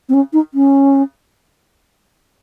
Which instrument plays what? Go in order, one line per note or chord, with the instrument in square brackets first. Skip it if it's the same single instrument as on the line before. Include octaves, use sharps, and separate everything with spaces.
[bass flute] C4
C#4
D#4
C#4